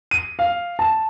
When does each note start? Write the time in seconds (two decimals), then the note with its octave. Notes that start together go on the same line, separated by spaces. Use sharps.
0.11 D#7
0.39 F5
0.79 A5